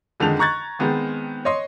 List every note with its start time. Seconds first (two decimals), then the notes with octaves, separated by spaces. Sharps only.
0.20 F2 D3 D#3 G#3 D#4 F7
0.39 A#5 C#6 F#6 G#6 A6
0.79 D#3 G#3 B3 C4
1.45 C#5 D#5 C6